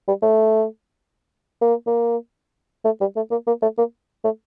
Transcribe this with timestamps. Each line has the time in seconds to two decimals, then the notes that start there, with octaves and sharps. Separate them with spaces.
0.08 G3
0.22 A3
1.62 A#3
1.87 A#3
2.85 A3
3.01 G3
3.16 A3
3.31 A#3
3.47 A#3
3.62 A3
3.78 A#3
4.25 A3